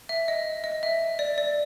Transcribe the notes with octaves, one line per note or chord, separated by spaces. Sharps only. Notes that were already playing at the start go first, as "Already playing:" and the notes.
E5
D#5
D#5
E5
D5
D5